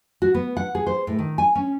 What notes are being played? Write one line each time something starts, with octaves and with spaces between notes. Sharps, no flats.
F#4
B3
F#5
G#4
C5
A2
D#3
G#5
C#4